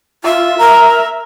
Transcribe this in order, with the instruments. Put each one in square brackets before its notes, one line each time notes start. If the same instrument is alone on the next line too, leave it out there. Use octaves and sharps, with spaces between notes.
[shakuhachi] F4 [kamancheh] E5
[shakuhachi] A#4 [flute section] A#5